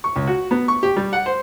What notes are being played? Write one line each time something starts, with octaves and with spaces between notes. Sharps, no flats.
C#6
C#2
F#4
B3
C#6
G4
G3
F#5
C5